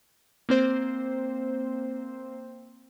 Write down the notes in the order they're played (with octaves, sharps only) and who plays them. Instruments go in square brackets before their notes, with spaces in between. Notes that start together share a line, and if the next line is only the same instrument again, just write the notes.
[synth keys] A#3 C4 C5